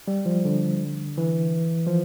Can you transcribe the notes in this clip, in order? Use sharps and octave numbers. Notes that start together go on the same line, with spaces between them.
G3
F3
D3
E3
F3